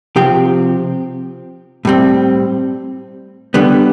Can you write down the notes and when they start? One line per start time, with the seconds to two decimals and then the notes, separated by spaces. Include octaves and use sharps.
0.16 C3 F3 C4 G4
1.85 A2 G3 C4
3.54 D3 G3 B3